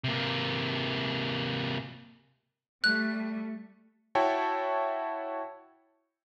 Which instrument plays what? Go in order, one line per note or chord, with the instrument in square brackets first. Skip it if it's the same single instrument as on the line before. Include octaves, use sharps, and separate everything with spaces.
[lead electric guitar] C3 A#3
[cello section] G3 A3 [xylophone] F#6
[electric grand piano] E4 F#4 C#5 E5 G5 A5